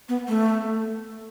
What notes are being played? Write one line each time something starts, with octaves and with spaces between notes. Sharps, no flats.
B3
A3